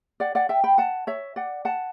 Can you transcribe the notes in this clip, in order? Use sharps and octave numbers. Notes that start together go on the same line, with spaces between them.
D5 F#5
D5 F#5
E5 G5
G5 B5
F#5 A5
C#5 E5
D5 F#5
F#5 A5